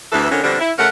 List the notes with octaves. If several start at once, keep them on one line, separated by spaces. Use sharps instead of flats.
D2 E3 A4
F2 D3 D#3 C#4
B2 D3 F3 G3 C4 D4
E4
C#3 A3 A#4 F#5